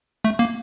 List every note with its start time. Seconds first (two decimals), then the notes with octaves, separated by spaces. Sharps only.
0.24 A3
0.39 A#3